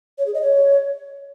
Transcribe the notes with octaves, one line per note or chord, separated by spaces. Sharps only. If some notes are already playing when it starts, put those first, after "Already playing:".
C#5
G#4
D#5
C#5